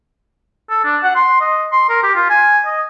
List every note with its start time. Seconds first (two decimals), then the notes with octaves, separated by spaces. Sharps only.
0.70 A4
0.85 D4
1.03 F#5
1.15 C6
1.41 D#5
1.72 C6
1.89 A#4
2.03 G4
2.15 F4
2.30 G#5
2.66 D#5